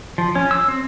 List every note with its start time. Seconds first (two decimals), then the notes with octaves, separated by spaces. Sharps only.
0.18 F3
0.35 C#4
0.51 E6
0.68 C4